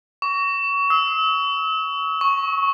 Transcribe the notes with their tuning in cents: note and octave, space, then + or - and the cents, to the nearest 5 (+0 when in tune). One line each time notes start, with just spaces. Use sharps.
C#6 +25
E6 -45
C#6 -5